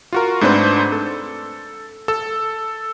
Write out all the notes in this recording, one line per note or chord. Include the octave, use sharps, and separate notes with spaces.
F4 F#4 A#4
G#2 A3 C4 D4 B4 C5
A4
A4 E6